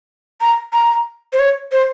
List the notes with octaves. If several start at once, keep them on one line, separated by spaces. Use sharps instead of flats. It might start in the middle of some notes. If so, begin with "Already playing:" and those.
A#5
A#5
C5
C#5
C5